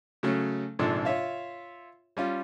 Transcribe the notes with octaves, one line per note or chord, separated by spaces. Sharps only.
C#3 F#3 A3 C#4
A#1 G#2 C3 F3 D4 A4
F4 C#5 E5 F5
G3 C#4 F4